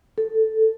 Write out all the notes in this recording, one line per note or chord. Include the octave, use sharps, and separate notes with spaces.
A4